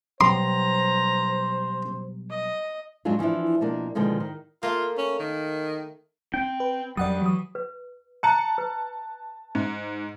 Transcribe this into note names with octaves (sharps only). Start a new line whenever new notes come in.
B2 F#3 G3 C5 A#5 C6
D#5
F2 G#2 F#3 G#3 D4 F4
E3 F3 D4 E4
B2 F3 A#3 D4
B2 D3 D#3 F3 G#3 A#3
D#3
A3 A#3 F4
C#4
D#3
C4 D4 G5
B4
F2 F#3 G3 D5 F#5 D#6
E3 F#3 D#6
B4
A5 A#5 F#6 C#7
B4
G#2